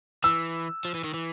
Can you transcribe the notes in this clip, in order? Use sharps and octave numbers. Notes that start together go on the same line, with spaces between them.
E3 E6
F3
E3
D#3
E3